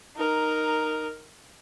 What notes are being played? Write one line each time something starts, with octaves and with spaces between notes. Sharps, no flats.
D#4 A#4